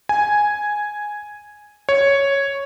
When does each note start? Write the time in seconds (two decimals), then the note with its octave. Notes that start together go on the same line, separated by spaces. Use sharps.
0.09 G#5
1.89 C#5